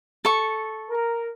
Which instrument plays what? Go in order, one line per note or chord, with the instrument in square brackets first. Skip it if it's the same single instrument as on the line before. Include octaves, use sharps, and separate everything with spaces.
[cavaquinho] A4 C#6
[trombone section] A#4